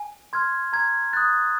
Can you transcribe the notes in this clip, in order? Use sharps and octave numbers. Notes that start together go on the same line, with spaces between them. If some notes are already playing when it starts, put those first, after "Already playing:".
Already playing: G#5
C6 F6 G#6
A#5 G#6
D#6 F#6 A6